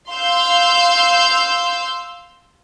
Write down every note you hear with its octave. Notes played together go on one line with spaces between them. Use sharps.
F5 C6 E6 G6